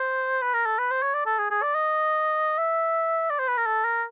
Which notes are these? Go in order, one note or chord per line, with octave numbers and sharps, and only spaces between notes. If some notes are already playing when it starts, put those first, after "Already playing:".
Already playing: C5
B4
A#4
A4
B4
C5
C#5
D5
A4
G#4
G#4
D5
D#5
E5
D5
C5
B4
A#4
A4
A#4